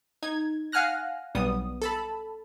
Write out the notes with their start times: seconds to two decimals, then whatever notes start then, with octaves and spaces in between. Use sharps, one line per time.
0.23 D#4 G#6
0.72 F5 F#5 G#5 F6 F#6 A#6
1.35 B1 G3 B3 D#6
1.82 A4 A5 B5